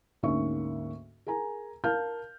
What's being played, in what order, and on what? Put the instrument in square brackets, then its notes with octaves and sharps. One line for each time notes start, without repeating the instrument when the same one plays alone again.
[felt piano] D2 G#2 A#3 C#4 E5 C#6
G#4 A#4 G#5 A#5
A#4 F5 A5 F6 G6